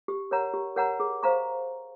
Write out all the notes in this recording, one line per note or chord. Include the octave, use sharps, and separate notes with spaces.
G4
A#4 C#5 F#5 A#5
G4
A#4 C#5 F#5 A#5
G#4
C5 F5 A#5 C#6